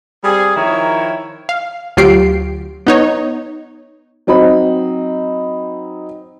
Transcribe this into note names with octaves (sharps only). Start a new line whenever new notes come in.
G3 C4 G#4
D#3 F3 E4 A#4 C#5
F5
D2 F#3 F4 G4 C7 D7
B3 D#4 C#5
F#3 C4 D#4 B5